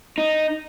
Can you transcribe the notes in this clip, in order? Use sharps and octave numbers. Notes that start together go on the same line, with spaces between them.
D#4